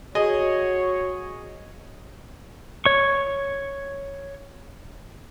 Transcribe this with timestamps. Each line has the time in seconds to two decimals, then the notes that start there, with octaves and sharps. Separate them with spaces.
0.15 F#4 G#4 C#5 D#5
2.86 C#5 C#6